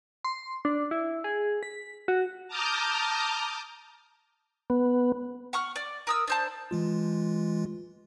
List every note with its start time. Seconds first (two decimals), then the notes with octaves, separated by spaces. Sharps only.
0.25 C6
0.65 D4
0.91 E4
1.24 G#4
1.63 B6
2.08 F#4
2.48 A5 A#5 D6 D#6 F6 G6
4.70 B3
5.53 F#5 C#6 F6
5.76 D5
6.07 A#4 D#6 E6
6.27 D4 C5 A5
6.71 E3 G#3 F4